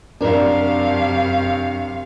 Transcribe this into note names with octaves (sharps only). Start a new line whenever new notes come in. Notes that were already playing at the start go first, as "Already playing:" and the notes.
F#2 C3 D4 A#4 F5